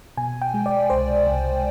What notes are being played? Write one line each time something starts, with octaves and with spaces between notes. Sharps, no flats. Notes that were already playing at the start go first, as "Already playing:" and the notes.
B2 G#5
G5
G#3
D5
C2 C5
C2